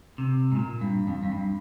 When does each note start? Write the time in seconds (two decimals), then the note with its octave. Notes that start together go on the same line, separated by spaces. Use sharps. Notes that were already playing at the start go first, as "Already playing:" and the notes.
0.18 C3
0.52 G#2
0.56 A#2
0.81 G2
1.07 F2
1.23 F2
1.32 G2